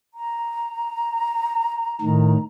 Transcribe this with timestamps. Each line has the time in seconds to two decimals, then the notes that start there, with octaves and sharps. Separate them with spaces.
0.14 A#5
2.01 A2 D#3